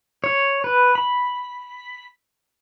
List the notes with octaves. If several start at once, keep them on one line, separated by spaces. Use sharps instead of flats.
C#5
B4
B5